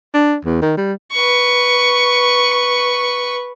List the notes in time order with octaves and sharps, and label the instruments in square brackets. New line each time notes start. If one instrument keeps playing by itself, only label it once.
[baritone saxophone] D4
E2
D#3
G3
[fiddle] B4 C#6